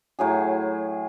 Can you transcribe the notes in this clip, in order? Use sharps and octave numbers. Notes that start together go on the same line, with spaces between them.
A2 F#3 G#4